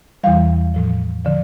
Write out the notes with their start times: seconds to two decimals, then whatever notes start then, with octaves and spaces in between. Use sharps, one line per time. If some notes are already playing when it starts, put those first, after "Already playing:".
0.23 E2 E3 G3 F5
0.74 A2 F3
1.25 D3 F3